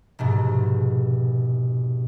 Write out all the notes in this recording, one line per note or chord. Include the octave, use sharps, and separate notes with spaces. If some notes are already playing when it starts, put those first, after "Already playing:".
F1 G#2 B2